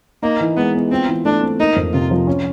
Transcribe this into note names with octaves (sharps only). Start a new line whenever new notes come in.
A#3 D#4
E3
G#3 B3
B3
C4 F4
E3
A3 D4
C4
A#3 D#4
F2
C3 F4
F3
C#4